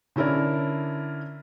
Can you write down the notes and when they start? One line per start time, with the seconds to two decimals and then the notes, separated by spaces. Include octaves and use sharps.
0.16 D3 C#4 E4 A#4 D5